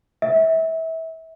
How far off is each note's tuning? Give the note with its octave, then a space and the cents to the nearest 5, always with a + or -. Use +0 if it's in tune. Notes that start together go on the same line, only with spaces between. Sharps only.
E5 -25